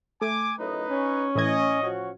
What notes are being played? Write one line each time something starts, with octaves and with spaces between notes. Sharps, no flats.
A3 G#5 D6
F#2 A2 D#4 B4 D#5
C#4
A2 E3 D#5 G#6
F3 C#4 F#4